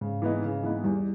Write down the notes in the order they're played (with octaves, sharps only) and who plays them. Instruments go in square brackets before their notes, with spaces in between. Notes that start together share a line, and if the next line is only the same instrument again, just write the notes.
[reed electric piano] G#2 [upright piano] C#3
[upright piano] E3 G#3 B3 D#4
C#3
E3 G#3 B3 D#4
[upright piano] E2 [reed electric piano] G3